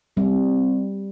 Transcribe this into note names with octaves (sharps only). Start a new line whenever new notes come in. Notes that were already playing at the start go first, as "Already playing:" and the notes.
G3 C4